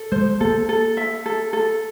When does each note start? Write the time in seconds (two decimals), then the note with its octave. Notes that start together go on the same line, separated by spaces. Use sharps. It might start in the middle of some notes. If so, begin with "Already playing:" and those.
Already playing: A4
0.12 G#3 C5
0.40 A#3 A4
0.69 A4
0.97 E5
1.26 A4
1.53 A4